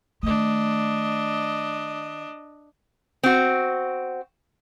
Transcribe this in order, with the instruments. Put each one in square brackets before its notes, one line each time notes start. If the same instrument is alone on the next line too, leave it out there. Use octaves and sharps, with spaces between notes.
[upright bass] D#3 A3 [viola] D4 D#5
[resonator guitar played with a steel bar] C4 F#4